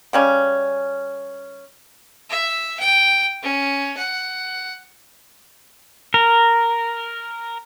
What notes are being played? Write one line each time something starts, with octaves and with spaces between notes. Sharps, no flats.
C#3 G3 C#4
E5
G5
C#4
F#5
A#4